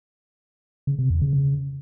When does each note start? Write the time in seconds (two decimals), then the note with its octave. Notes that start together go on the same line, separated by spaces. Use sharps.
0.87 C#3
0.99 C3
1.10 E2
1.22 C#3
1.33 C#3